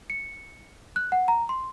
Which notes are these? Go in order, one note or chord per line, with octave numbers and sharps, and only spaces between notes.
C#7
F#6
F#5
A#5
C6